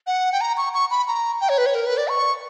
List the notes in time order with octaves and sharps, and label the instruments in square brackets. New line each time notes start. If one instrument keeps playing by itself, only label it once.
[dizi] F#5
G5
A#5
C#6
C#6
B5
A#5
G5
C#5
B4
C#5
A#4
B4
D5
C#6